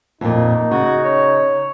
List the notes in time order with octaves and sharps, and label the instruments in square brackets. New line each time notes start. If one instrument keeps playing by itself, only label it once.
[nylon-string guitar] F2 A#2 [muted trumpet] D#4
[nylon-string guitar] C#3 [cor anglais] F#4
[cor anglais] C#5